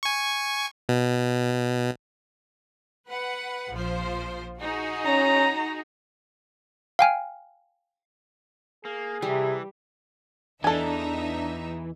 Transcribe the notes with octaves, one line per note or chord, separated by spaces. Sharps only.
G#5 C#6
B2
B4 F#5
A#1 F3 C5
D#4 F#4 G#4
C#4 A#5
F5 G5 G#5 F6
A#3 G#4
C3 E3 G3
E2 E3 D4 D#4 A4 E5 G#5